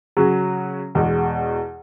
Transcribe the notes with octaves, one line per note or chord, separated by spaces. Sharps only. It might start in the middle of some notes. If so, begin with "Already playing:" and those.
C#3 F#3 C#4 F#4
E2 B2 G#3